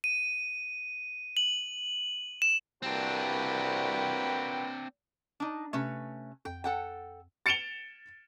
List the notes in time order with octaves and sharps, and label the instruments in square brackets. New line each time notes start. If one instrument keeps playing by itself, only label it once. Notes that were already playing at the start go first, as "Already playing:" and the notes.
[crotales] D#7
F#7
E7
[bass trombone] C2 [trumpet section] A#3 F#4 B4 [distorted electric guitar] C4 D4 [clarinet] G5
[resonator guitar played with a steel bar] D4 D#4
[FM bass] C3 [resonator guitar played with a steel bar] A3 C#4 B4
[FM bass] F2 [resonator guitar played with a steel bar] G5
[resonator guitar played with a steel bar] A4 F#5 G5
[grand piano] A6 C#7 D7 E7 F7 G7